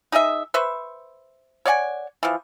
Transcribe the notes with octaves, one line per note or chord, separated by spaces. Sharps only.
D#4 G#4 D#5 E5
B4 C5 E5 C#6
C#5 D5 F#5 G#5
E3 F3